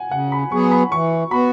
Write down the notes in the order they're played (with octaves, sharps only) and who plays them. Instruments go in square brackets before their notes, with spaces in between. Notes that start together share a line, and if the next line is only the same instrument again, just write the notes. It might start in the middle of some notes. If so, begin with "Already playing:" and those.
Already playing: [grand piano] F#5 G#5
[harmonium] C#3 [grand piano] F#5
[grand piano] B5
[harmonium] F#3 B3 G#4 [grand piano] C#6
[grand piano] B5
[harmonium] E3 [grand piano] C#6
[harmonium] B3 F#4 [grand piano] B5